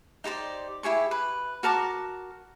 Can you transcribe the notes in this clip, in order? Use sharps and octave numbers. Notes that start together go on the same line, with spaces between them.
D#4 G4 C5 D5
E4 G4 G#4 C#6
B4
F#4 A#4 A5 D6